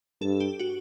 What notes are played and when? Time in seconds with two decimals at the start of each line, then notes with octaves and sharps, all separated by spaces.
0.21 G2 A4
0.40 G4
0.59 F#4